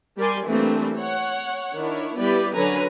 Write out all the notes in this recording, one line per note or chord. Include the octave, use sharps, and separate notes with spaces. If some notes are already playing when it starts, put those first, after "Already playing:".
G3 G4 A#4 D5 G#5 C6
E3 G3 A3 A#3 C4 D4
C#5 F#5
D#3 D4 E4 C#5
G3 B3 E4 G4 B4 D5
D3 F#3 C#4 B4 G#5 A#5